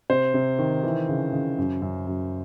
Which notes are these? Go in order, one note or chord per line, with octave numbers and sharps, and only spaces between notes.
C3 C5
C3
D#3
E3
C#3
C#3
F#2
F#2
F#2